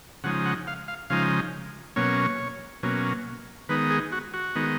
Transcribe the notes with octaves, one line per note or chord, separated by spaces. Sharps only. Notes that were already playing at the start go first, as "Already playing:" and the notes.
C#3 F3 G#3 D#4 F#5
F#5
F5
F5
C#3 F3 G#3 D#4 F5
B2 F#3 A#3 C#4 C#5
B2 F#3 A#3 C#4
D#3 G#3 B3 D#4 B4
G#4
F#4
F#4
D#3 G#3 B3 D#4